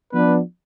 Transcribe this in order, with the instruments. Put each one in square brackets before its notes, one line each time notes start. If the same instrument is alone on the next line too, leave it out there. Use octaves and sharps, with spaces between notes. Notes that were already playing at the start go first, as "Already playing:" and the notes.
[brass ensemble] F3 B3 D4 B4